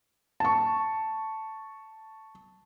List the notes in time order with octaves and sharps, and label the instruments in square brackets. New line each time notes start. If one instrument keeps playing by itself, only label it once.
[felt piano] A5 C#6